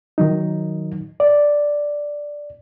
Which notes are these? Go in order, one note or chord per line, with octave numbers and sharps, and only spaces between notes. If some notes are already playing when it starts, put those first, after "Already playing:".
D#3 F#3 D#4
D5